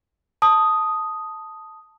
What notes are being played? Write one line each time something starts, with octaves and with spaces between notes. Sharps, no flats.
A5 D#6